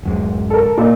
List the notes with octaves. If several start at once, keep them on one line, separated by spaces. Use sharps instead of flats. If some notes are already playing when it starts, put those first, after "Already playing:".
D1 F#2 G#3
A4 A#4
A#2 A#3 D#4